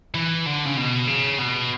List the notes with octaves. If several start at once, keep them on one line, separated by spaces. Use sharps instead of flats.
E3
D3
C#3
B2
C#3
B2